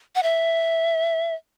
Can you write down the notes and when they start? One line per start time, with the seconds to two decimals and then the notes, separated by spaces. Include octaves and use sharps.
0.15 F#5
0.23 E5